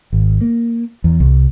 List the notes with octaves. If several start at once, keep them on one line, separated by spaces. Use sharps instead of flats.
G#1
A#3
E2
C2